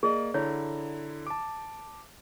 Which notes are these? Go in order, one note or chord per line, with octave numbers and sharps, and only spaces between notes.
A#3 G#4 D5 D#5
D3 E4 C#5 A#5
A5 D6